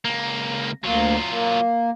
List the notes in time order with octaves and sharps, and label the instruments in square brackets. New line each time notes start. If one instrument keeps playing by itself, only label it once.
[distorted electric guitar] C#2 A#3
[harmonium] D2 A#3 [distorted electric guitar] F#3 F4
[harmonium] A#3